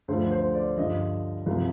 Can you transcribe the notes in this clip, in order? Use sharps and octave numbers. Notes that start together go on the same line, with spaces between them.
D2 D3 F3 C5
C5
D5
G2 D3 F3 D#5
C2 C3 F3